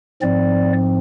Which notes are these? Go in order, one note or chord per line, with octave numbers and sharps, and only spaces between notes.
G#2 F3 C4 D5